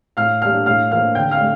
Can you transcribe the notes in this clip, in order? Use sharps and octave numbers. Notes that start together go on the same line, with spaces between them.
A2 F5 F6
G3 A#3 D4 F5 F6
A2 F5 F6
F3 A#3 F5 F6
D3 G5 G6
F5 F6
A3